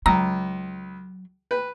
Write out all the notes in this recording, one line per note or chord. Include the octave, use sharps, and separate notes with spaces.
C#2 F#3 A#5
B4